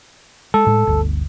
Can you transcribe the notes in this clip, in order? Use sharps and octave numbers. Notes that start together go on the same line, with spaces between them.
G#3 A4
A2 G#3
G1 D2